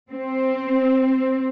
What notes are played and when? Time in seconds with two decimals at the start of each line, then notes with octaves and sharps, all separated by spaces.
0.11 C4